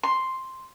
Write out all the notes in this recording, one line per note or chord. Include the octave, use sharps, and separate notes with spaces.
C6